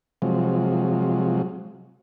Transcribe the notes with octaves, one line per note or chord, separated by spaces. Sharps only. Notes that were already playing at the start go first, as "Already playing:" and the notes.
C3 F3 F#3 G#3